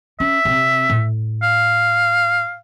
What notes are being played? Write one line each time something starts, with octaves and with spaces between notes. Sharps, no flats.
C#4 E5
C3 C4
A2
F5